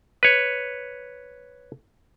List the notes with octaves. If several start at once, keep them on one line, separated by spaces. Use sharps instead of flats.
B4 C#5